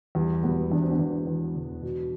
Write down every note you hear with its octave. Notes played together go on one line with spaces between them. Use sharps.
E2 G3
E1 G3 B3
E2 D4
C4
B3 D4
E2
E2
E1
B2